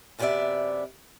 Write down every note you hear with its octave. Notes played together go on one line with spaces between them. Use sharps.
F#2 C3 B3 F#4 D5 E5